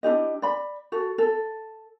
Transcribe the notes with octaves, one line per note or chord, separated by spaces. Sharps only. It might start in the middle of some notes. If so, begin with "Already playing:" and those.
D4 E4 G4 D#5
D5 B5
F#4 A4
A4